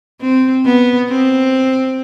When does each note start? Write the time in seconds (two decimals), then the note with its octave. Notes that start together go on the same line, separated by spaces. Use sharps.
0.21 C4
0.65 B3
1.09 C4